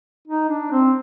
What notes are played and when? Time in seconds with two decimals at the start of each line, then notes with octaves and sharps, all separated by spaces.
0.28 D#4
0.49 D4
0.72 C4